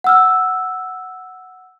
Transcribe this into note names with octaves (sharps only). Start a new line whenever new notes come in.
F#5 E6 F6